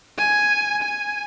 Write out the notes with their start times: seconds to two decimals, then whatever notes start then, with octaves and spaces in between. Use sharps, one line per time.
0.18 G#5
0.82 G#5